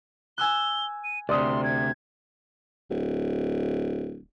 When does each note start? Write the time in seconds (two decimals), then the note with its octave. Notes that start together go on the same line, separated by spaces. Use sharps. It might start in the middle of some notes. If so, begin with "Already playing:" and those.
0.38 G#5 E6 F#6 G7
1.04 D#7
1.29 D2 C3 D5 C6 D#6
1.64 G#6
2.90 D1